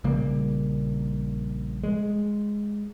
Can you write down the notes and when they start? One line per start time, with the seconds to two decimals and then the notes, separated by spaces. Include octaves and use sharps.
0.04 A#1 C#3 G3 A#3
1.83 G#3